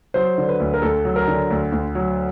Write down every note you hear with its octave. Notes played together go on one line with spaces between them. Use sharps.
F#3 C5
D3
B4
D2
A#4
D2 A4
F#3
A#4
D3
D2
D2
F#3